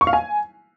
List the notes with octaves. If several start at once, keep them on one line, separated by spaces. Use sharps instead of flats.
C#6
F5
G#5